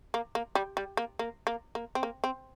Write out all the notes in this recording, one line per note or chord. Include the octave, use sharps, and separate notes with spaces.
A#3
A#3
G3
G3
A#3
A#3
A#3
A#3
C4
A#3
C4